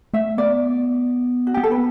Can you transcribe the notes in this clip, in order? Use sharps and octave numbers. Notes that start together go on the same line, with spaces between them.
A3 E5
B3 D5
F#4
B3 G4
A4
B4